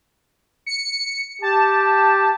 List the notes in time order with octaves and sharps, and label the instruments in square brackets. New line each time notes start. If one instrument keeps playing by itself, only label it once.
[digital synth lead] C#7
[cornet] G4 [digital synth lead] A5